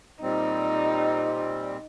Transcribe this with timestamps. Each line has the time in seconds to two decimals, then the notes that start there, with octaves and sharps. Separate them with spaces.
0.22 A#2 G3 C4 D#4